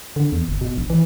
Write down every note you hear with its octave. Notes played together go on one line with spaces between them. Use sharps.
D3
E2
G1
B2
A#1
E3